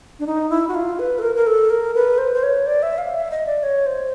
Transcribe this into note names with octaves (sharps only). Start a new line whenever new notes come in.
D4
D#4
E4
F#4
F4
B4
A4
A#4
A#4
A4
A#4
B4
C5
C5
C#5
D5
E5
F5
E5
D#5
D5
C#5
C5